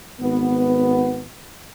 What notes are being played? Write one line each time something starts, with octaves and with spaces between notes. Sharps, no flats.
G#1 B3